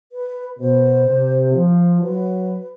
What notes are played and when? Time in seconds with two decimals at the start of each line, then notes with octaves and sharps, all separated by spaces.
0.12 B4
0.59 B2 C5
1.06 C3
1.54 F3
2.01 F#3 B4